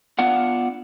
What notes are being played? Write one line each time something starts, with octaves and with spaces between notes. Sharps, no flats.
B3 D4 F4 F5 F#5